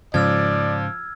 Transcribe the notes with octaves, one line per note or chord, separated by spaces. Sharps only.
G#2 C#3 F3 D5 E6 F6 G#6